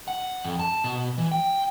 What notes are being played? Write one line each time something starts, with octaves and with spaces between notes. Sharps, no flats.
F#5
F2
A5
B2
E3
G5